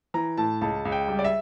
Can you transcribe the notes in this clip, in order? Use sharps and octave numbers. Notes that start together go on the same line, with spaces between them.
E3 A#5
A2 A5
C#2 A5
C#2
G5
G3
D5
E5